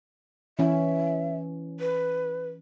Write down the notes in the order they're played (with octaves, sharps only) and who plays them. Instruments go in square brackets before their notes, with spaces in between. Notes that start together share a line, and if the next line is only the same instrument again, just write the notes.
[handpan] E3 C#4 [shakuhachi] E5
[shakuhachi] B4